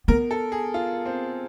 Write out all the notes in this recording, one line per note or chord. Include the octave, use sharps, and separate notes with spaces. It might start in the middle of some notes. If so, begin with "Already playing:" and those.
B3 A#4
A4
G#4
F4
C4